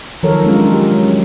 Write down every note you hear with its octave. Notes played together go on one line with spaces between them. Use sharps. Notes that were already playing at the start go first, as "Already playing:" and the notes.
D#3 F3 F#3 A4 A#4 C#5
G#3 C#4 D4 F4
A#4
G4
G#3 C#4
F#3